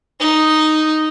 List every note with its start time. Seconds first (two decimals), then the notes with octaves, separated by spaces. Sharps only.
0.20 D#4